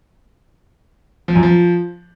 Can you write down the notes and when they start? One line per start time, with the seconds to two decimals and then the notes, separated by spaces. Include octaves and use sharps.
1.28 F3
1.35 F#2
1.43 F3